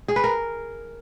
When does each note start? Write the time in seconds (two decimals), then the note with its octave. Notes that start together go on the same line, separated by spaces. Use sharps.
0.08 G#4
0.16 B4
0.24 A#4